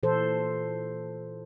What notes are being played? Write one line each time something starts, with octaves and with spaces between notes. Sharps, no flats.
A#2 E3 A4 C5